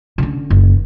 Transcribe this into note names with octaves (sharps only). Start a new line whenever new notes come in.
D3 C#4
F#1 D#3